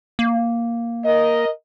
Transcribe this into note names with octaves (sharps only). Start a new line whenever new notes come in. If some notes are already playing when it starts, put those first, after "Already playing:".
A#3
A#4 D#5